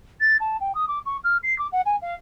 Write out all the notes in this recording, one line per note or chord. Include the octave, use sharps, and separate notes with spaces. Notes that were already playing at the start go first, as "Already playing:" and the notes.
A6
A5
G5
D#6
D6
C#6
F6
C7
D6
F#5
G#5
F5